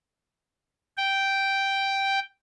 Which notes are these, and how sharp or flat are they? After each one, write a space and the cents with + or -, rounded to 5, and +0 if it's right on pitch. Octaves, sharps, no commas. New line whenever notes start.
G5 -5